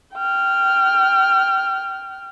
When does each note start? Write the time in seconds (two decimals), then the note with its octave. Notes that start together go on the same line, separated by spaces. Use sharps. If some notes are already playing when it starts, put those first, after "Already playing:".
0.14 G5 F6